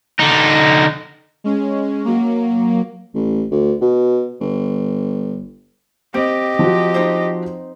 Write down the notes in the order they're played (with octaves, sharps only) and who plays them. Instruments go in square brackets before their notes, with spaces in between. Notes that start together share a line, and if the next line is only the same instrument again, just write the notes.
[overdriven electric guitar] D3 D#4
[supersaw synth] G#3 C#4
F#3 A#3
[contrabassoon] A1
D2
B2
G1
[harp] C4 [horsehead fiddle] G4 D#5 [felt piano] D7
[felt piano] F3 F#4
[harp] D#4 C5